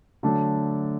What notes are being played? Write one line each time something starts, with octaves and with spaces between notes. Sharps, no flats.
D3 F#3 A3 D4 A4